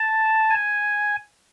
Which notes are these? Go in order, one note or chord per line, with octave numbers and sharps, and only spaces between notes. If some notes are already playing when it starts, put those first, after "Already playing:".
Already playing: A5
G#5